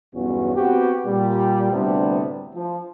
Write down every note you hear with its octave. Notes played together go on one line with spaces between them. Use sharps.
B1 E2 G2 B2 C#4 F#4
B3 C4 F#4 G4
A#2 G3 G4
D2 A2 C3 G3 B3 D4
F3